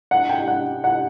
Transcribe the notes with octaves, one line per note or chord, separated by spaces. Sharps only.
F#5
G5
F#5
F#5